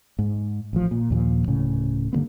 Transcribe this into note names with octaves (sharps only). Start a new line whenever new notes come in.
G#2
A1 F3
A#2
D#2 A#2 F3
D1 A2 C#3
G2 D3 A#3 B3